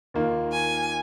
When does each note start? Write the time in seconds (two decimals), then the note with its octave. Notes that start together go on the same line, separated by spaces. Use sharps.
0.14 D#2 D#3 A#3 F4
0.52 G#5